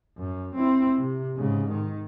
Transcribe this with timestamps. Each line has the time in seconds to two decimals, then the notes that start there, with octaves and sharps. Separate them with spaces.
0.18 F#2
0.55 C4 E4
0.98 C3
1.36 G#2 C#3
1.70 D#3